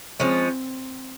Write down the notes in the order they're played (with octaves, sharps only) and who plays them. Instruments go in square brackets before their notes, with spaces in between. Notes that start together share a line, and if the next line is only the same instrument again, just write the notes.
[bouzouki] F3 G#3 C#4 [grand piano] C4